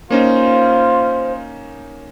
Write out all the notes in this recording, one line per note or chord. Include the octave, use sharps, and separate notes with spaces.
A#3 C#4 D#4 F4 C5